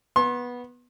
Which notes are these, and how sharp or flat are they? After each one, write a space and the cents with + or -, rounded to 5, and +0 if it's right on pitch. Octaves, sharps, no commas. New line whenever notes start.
B3 -10 C6 +35